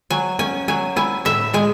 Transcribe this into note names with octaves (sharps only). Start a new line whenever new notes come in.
F#3 G#5
C#4 G#5
F#3 G#5
E4 G#5
A2 E5
G#3 G#5